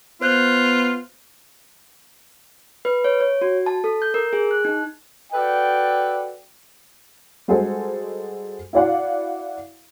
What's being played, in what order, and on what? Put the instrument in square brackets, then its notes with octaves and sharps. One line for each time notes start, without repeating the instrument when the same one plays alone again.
[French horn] B3 [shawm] F4 [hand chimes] C5 F#6 G6
[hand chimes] B4
C#5
C#5
F#4
A5
A4
G6
A#4
G#4
F#6
D#4
[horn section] F#4 A4 B4 D5 G5
[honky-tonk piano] G3 G#3 F#4 G#4 A4 C5
E4 F#4 D5 F5 F#5